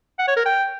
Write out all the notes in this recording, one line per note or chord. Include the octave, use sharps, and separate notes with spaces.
F#5
C#5
A#4
G5